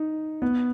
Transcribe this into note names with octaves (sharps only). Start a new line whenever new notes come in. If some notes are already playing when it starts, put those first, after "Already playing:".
Already playing: D#4
B3